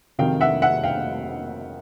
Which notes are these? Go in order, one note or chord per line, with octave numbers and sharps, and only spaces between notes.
F1 F2 C3 D#3 F#3 F5 G5
E5 F#5
E5 F#5
F5 G5